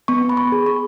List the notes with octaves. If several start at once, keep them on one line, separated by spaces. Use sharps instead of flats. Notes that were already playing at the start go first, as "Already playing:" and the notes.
B3 C#6
B5
C#6
G#4
C#6